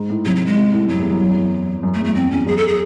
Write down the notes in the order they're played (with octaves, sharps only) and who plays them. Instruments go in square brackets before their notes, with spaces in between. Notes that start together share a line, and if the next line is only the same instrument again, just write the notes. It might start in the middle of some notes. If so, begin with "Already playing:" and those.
Already playing: [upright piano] G#2
A2
[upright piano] C3 [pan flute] F#3
[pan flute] F#3
G#3
[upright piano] C3
A2
[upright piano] F#2 [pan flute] F#3
[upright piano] E2
F#2
F#2
E2
F#2
F#2
[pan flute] A3
[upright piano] E2
[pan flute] A3
[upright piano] F#2 [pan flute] C4
[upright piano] E2 [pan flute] C#4
[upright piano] F#2 [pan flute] G#4
[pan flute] A4
G#4